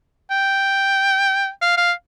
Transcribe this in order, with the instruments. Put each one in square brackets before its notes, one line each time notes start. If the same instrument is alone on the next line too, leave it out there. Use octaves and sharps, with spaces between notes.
[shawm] G5
F5
F5